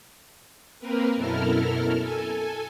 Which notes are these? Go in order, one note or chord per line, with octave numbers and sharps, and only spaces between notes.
A#3 C4 A#4 B4
F#2 B2 E4 A4 A#4 F6
A4 G#5